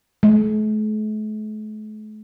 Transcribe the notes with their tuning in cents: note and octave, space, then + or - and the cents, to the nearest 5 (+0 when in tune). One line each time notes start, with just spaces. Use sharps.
A3 -45